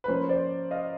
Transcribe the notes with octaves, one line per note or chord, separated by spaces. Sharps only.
B4
F3 A#3 C#4 C5
C5 D5
D#5 F5